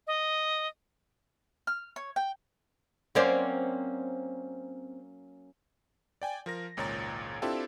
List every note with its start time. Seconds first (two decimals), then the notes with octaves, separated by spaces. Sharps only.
0.07 D#5
1.67 F6
1.96 C#5
2.16 G5
3.15 F#3 A#3 C4 C#4 C5 D5
6.22 D5 G5 G#5
6.46 F3 A#4 A#6
6.77 G#1 C#2 A#2 C#5 A#5 A6
7.42 C4 D4 E4 F4 G4 A4